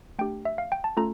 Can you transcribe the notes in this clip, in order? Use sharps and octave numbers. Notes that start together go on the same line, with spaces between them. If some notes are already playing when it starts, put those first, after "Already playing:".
A3 D4 G4 G5
E5
F5
G5
A5
A3 C#4 F4 A4 A#5